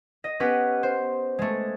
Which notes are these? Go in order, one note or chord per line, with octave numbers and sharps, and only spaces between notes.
D#5
B3 C#4 G4 B4
C5
G#3 A3